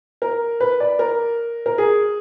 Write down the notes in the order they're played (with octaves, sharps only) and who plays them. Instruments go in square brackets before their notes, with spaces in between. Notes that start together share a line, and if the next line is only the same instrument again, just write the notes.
[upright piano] A#4
B4
D5
A#4
A#4
G#4